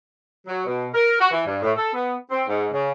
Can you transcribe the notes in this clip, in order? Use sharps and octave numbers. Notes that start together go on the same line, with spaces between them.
F#3
B2
A#4
F#4
E3
G2
A2
A4
B3
C4
G#2
C#3